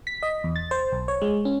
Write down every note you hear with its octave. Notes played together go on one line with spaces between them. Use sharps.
B6
D#5
E2
A6
C5
B1
C#5
G#3
C#4